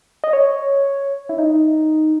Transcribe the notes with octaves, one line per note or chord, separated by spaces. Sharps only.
D#5
C#5
E4
D#4